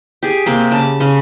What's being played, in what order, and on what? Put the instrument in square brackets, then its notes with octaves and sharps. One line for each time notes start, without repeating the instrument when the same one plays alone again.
[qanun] G4 G#4
C3 A#3 C6
C#3 A5
C#3 C#4